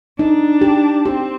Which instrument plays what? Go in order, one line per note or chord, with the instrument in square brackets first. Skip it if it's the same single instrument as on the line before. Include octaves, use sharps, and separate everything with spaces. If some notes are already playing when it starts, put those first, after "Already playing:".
[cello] D4 [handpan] D#4
[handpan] G4
[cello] C4 [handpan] G4